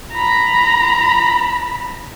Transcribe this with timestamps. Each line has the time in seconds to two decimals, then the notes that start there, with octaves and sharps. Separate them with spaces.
0.12 A#5 B5